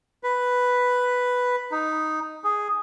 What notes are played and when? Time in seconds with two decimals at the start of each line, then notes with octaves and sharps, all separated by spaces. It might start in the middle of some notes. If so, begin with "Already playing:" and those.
0.23 B4
1.72 D#4
2.44 G#4